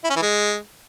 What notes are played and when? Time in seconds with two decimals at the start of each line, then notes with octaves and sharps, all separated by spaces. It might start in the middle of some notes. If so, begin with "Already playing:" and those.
0.04 E4
0.10 C#4
0.16 E3
0.22 G#3